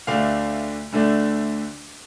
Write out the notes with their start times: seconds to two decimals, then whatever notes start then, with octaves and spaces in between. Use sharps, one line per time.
0.07 D2 D3 A3 D4 F5
0.92 D2 D3 A3 D4